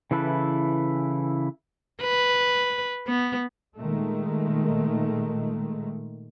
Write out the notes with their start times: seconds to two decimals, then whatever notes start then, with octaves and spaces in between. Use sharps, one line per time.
0.11 C#3 E3 E4 A4 B4
2.02 B4
3.07 B3
3.76 A#2 D#3 G#3 A3